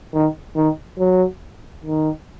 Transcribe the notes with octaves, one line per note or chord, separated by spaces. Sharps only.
D#3
D#3
F#3
D#3